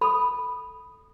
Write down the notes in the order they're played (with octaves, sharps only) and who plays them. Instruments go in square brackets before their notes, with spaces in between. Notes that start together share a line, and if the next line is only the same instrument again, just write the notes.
[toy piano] A4 B5 D#6